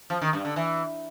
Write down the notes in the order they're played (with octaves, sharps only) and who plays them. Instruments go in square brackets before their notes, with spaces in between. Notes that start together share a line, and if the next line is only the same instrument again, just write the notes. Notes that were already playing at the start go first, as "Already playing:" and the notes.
[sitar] F3
D#3
G2
D3
E3